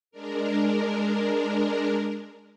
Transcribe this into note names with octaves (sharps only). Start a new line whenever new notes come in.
G#3 D4 A#4